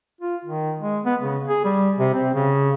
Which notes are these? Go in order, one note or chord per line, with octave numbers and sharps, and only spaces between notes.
F4
D#3
G#3
B3
C#3
G#4
G3
C3
C4
C#3